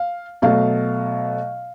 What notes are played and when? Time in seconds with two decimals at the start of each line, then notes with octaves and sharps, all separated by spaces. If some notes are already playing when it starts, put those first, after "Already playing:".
Already playing: F5
0.42 B2 F#3 A3 F5